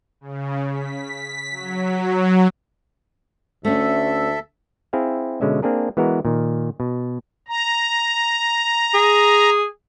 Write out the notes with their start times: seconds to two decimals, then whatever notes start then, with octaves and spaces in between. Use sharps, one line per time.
0.21 C#3
0.72 B6
1.51 F#3
3.65 D2 A3 C#4 A4 E5
4.93 C4 E4 G#4 E5 F5
5.41 B2 D3 G#3 C#4 E5
5.62 A#3 C4 D4 G#4 A#4
5.97 E3 G#3 B3 F#4 A#4
6.25 A#2 D#3
6.80 B2
7.48 A#5
8.94 G#4